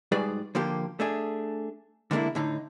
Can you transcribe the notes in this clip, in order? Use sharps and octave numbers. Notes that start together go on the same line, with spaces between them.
G#2 G3 F#4 G#4 B4 D5
D3 F3 A#3 G4
A3 D4 G#4
D3 G#3 A#3 D4 E4
A2 D3 D#4